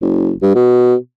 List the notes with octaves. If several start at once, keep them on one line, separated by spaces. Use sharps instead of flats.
F#1
G2
B2